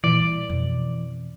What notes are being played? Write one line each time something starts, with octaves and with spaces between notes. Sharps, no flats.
A#2 E3 D5
G3
F2 B2